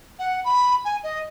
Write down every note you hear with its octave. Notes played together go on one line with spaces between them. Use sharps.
F#5
B5
G#5
D#5